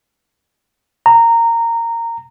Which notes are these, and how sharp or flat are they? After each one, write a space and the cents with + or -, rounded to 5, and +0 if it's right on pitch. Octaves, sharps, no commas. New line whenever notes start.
A#5 -15